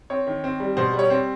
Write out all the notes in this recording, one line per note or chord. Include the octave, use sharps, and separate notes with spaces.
C4 C#5
D#3
C4
G3
B2 C5
G3
C#5
C4